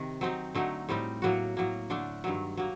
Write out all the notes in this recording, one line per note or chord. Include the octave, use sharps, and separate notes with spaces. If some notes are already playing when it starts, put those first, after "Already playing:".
Already playing: C3 D#3
F#3 C4 D#4
D3 F#3 A3 D#4
A2 G3 C4 D#4
A2 F#3 A#3 F#4
A2 F#3 A#3
D3 A3 D4
G2 D#3 F#3
F#3 A#3